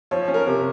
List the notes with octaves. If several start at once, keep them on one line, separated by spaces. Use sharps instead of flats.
F3 C#5
C#4
A#4
C3